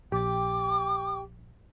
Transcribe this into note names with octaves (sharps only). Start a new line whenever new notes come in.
A#1 G4 G5 D6